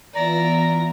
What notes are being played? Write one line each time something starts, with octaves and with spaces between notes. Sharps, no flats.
E3 B3 F4 D5 E5 A#5